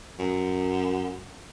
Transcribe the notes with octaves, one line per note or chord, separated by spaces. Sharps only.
F#2